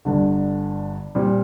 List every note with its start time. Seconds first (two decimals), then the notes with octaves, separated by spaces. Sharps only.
0.05 G1 G2 D3
1.15 A#2 G3 C4